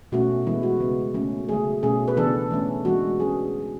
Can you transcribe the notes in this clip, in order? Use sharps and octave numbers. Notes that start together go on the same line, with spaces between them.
B2 A3 C#4 F#4
E3 G#3 B3 E4
F#4
C#3 G#3 B3
C#3 F#3 A3 C#4
C#3 F#3 A3 G#4
B2 A3 C#4 G#4
B4
C#3 E3 B3 D4 A4
E3 A3 C#4
E3 G#3 D4 F#4
F#3 C#4 G#4